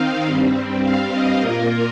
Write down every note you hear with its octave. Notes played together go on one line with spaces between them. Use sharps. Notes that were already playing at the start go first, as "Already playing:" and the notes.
Already playing: D#3 C4 D#4 F5
G2 G3 C4
F5
D#5
A#2 A#3 F4 A#4